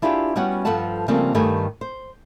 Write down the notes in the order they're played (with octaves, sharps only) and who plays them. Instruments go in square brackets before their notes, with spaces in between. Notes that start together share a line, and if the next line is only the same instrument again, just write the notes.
[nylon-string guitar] D4 E4 F4 G4 G#4 B4
G3 B3 C#4 F#4 C#5 F#5
G2 F3 A4 B4 F#5 A5
C#3 F3 G3 A3 A#3 C4
G2 D#3 A3 G4 B4 G#5
C5